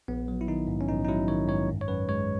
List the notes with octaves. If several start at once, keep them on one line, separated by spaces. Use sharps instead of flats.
A#1 B3
F#3
E4
D#3 D#4
G#2
C#4
A#1 D#4
D#4
F#3 E4
D#3 C#5
G#2 C#5
F#2
C#5
F#2 B4
G#3 C#5